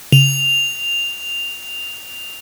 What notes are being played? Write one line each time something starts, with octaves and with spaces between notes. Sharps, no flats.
C#3 F7